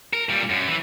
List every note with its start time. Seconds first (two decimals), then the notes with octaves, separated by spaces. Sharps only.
0.13 A#4
0.29 A#2 G3
0.50 F#2
0.68 E3